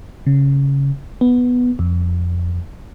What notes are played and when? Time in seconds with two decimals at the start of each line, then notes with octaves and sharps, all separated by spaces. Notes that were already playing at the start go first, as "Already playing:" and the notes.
0.27 C#3
1.21 B3
1.79 F2